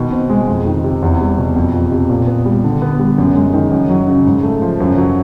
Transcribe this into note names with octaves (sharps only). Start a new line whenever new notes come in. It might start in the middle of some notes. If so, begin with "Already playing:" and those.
Already playing: B2 D#3
C4
G#3
F2
D#3
C3
E2
G3
B2
F2
F3
C3
A#2
B3
G3
D3
B3
G3
F#2
G#3
D#3
F#2
F#3
C#3
G#2
A3
F3
F#2
F#3